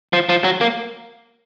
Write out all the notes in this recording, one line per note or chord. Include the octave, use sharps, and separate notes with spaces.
F3
F3
F#3
A#3